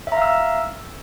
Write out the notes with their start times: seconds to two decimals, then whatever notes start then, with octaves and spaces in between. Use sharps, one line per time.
0.07 E5
0.12 A#5
0.17 F5
0.22 E6